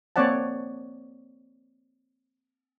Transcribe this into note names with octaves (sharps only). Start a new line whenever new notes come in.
A#3 C4 C#5 D5 F#5 A5